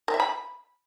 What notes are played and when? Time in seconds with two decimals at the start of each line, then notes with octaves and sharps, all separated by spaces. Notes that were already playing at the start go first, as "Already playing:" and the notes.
0.08 A#4
0.14 E5
0.20 B5